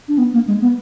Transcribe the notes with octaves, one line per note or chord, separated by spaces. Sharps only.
D4
B3
A#3
G#3
B3